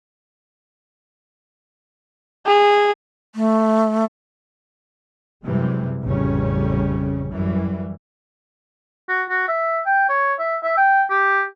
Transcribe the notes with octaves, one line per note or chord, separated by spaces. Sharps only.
G#4
A3
F#2 C3 E3 G3 G#3
A1 F2 C#3 G3 C#4
F#2 E3 G3
F#4
F#4
E5
G5
C#5
E5
E5
G5
G4